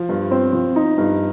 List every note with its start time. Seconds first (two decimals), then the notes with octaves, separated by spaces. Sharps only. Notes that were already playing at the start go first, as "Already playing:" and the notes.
Already playing: F3
0.09 G2
0.31 C4
0.53 F3
0.76 D#4
0.98 G2